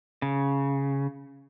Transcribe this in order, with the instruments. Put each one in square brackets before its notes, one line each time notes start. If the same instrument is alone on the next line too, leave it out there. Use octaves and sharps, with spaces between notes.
[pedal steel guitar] C#3